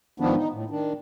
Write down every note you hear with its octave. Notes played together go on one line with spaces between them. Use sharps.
G#2 D#3 F3 B3 D4
D#4
A2
D#3 D4